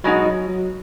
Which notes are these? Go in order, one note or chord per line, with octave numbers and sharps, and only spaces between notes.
B2 F#3 G#3 D#4 F#4
F#3
F#3